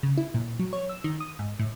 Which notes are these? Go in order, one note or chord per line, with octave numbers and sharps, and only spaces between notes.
C#3
E4
A#2
F#3
C#5
E6
D#3
D#6
G#2
A2